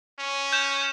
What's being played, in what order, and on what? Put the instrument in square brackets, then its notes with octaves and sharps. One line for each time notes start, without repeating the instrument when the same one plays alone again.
[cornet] C#4
[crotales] G6 E7